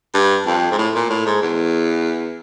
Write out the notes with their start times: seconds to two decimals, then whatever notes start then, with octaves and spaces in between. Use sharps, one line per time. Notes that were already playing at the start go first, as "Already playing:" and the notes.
0.14 G2
0.47 F2
0.72 G#2
0.78 A2
0.95 A#2
1.10 A2
1.26 G#2
1.43 E2